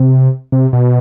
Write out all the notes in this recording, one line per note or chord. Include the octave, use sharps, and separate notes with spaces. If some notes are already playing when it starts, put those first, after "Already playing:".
Already playing: C3
C3
B2